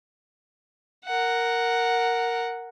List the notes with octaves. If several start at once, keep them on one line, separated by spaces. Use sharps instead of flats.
A#4 F#5